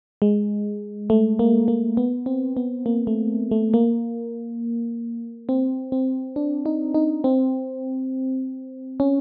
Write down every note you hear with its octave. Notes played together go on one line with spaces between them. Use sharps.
G#3
A3
A#3
A#3
B3
C4
B3
A#3
A3
A3
A#3
C4
C4
D4
D#4
D#4
C4
C#4